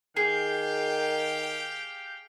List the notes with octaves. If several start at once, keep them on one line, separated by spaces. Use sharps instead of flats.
D#3 G4 G#4 F5 G5